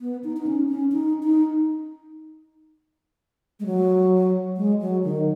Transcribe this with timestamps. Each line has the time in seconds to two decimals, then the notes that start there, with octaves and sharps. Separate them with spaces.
0.01 B3
0.24 D#4
0.37 D#4
0.47 C#4
0.69 C#4
0.92 D#4
1.23 D#4
3.60 G#3
3.66 F#3
4.57 G#3
4.81 F#3
5.04 D#3